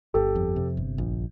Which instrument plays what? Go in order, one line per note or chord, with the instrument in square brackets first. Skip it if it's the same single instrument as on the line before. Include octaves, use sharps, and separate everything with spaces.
[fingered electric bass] G1 [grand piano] G4 A4
[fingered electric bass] F2
C3
G1
A#1